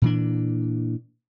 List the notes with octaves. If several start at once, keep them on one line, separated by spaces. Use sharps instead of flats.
A#2 E3 D4